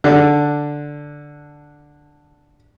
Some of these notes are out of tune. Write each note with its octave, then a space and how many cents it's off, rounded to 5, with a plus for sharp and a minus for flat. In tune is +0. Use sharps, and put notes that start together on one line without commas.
D3 +0 D4 +0